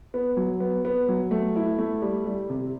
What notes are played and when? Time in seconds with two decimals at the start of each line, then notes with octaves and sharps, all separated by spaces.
0.14 B3
0.37 F#3
0.60 B3
0.85 B3
1.09 F#3
1.31 A3
1.56 E4
1.79 A3
2.02 G3
2.26 G3
2.50 C3